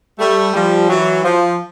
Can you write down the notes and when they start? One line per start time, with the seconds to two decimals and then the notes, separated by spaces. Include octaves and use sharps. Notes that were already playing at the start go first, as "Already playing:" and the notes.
0.19 G3 A3
0.53 F3 G3
0.89 E3 F#3
1.24 F3